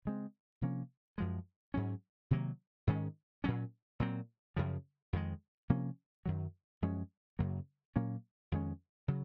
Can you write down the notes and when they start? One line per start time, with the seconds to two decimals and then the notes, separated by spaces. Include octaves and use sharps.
0.05 C#3 G#3 C4
0.61 C3 F3 A#3 C#4
1.18 F#2 F3 G#3
1.74 G#2 F#3 C#4
2.31 C3 D#3 F#3 A#3
2.87 G#2 D#3 G#3 C#4
3.44 A#2 F#3 C#4
4.00 A#2 F#3 C4
4.56 F#2 C#3 F3
5.13 F2 D#3 G#3
5.70 C3 F3 A#3 C#4
6.26 F#2 D#3 F#3
6.82 F#2 F3 G#3 C#4
7.39 F#2 C#3 F#3 A#3
7.96 A#2 F#3 A#3 C#4
8.52 F2 D#3 G#3 C#4
9.08 C#3 F#3